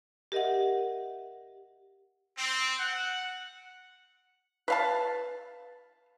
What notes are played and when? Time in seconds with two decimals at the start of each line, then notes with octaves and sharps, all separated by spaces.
0.32 G4 A#4 D#5 E5 F#5
2.37 C4
2.78 F#5
4.68 B4 F5 A5